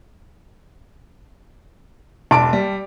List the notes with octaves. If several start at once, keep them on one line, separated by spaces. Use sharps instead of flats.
E1 D5 A5 D6 D7
G3